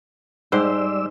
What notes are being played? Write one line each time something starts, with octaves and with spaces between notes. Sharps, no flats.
G#2 G3 G4 C5 D5 E6